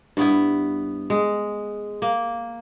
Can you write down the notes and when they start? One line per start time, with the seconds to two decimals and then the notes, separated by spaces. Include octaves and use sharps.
0.17 G2 B3 E4
1.10 G#3
2.02 A#3